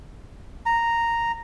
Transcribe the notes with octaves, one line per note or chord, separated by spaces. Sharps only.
A#5